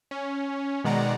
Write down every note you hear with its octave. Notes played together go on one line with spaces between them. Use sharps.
C#4
B2 D#3 G#3 D5 F#5 A#5